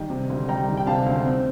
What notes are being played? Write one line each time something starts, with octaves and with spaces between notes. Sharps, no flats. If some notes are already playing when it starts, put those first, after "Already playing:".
Already playing: D#3 G3 D#5 G5
C3
D2
G3 G5 A#5
D#3
G5
C3 F5 A5
D2
C4